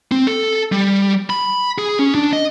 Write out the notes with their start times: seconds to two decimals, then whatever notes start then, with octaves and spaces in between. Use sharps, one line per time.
0.12 C4
0.27 A4
0.72 G3
1.30 B5
1.78 G#4
1.99 C#4
2.15 D4
2.33 D#5